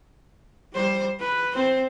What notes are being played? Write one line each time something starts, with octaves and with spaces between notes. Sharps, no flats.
G3 C5
B4
C4 C5